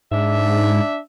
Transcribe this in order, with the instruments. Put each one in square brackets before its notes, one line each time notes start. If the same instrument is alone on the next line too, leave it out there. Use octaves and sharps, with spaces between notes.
[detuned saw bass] G#2 [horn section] D4 E5